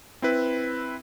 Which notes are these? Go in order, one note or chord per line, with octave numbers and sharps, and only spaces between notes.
C4 E4 B4